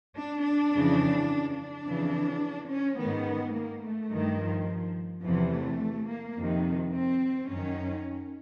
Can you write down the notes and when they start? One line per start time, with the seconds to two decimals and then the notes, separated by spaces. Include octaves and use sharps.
0.16 D4
0.45 D4
0.73 F2 C#3 E3
1.58 D4
1.85 F2 C#3 E3
2.70 C#4
2.98 G#2 D#3 B3
3.55 A#3
3.83 A3
4.11 G2 D#3
4.39 F3
5.23 E2 C3 E3 F3
5.52 A3
6.08 A#3
6.37 F2 C3 D#3
6.92 C4
7.49 F#2 D#3 C#4